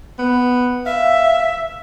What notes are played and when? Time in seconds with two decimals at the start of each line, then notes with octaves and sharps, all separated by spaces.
0.19 B3
0.86 E5 F5